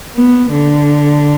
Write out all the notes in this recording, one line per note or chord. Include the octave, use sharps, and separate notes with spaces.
B3
D3